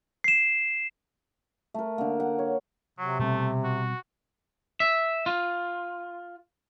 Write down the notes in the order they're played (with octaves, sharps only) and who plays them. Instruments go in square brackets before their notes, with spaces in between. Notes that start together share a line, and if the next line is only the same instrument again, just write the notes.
[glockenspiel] C7 E7
[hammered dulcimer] A3 A#4
D3 A#3
F#5
C#5
[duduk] C3 [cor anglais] F#3
[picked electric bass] B2 G3 C4 [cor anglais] A3
[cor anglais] F#4
[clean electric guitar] E5
F4